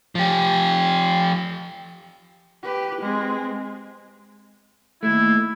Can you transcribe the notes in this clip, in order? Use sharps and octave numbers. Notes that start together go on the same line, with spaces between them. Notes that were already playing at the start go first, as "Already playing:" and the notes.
F3 G4
G4 B4
G#3 C4
D#2 A3 E4